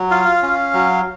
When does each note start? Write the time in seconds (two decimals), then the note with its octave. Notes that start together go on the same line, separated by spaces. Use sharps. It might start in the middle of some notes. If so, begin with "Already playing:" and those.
Already playing: F#3
0.11 F4 F5
0.42 C#4
0.74 F#3